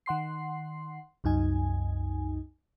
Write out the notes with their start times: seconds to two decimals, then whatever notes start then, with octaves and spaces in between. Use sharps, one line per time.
0.06 D#3 F#5 C6 C7
1.24 C2 F#2 D#4 G#5